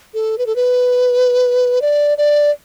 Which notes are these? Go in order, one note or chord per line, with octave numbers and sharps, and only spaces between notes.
A4
B4
A4
B4
D5
D5